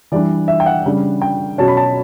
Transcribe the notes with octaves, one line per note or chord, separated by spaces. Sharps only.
E3 G3 D4 D5
E5
G5
F#5
C#3 G3 D4
G5
B2 F#3 C#4 A5
B5
A5